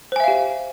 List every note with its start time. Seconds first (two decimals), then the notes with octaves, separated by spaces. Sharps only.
0.12 C5
0.16 G#5
0.20 E5
0.24 F5
0.28 G4